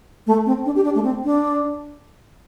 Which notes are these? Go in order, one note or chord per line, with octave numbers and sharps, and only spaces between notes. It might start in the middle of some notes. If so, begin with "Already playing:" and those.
A3
C4
D4
G4
D4
A3
C4
D4